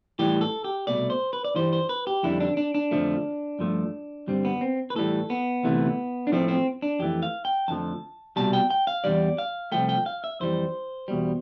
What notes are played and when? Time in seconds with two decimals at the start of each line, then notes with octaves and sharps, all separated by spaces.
0.19 A2 E3 G3 G4
0.41 A4
0.64 G4
0.87 C2 B2 A3 D5
1.10 C5
1.33 B4
1.44 D5
1.55 G2 E3 G3 C5
1.73 C5
1.89 B4
2.07 G4
2.23 F2 D3 G3 E4
2.40 D4
2.57 D4
2.75 D4
2.91 F2 D3 F3 A3
3.59 G2 F3 A3
4.27 G2 D3 G3 C4
4.45 B3
4.61 C4
4.90 B4
4.96 A2 E3 G3 A4
5.30 B3
5.63 D2 C3 E3 A3
6.27 D4
6.32 A2 F3 A3 C4
6.48 C4
6.82 D4
6.99 F2 E3 A3 G4
7.23 F5
7.45 G5
7.68 F2 D3 F3 A3 A5
8.36 C2 B2 G3 A5
8.53 G5
8.70 G5
8.87 F5
9.04 E2 C3 G3 D5
9.38 F5
9.72 C2 C3 F3 A3 G5
9.89 G5
10.06 F5
10.24 E5
10.40 F2 E3 G3 C5
11.08 E2 B2 G3